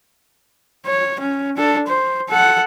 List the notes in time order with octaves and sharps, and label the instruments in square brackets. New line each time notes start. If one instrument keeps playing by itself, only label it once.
[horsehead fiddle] C#5
C#4
D4 A4
C5
A4 F#5